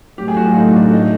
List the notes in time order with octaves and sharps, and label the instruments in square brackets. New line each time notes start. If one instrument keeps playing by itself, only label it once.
[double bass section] A2 F#3 A3 [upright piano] G4
[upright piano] G#4
F#4
F4
D#4
D4
D#4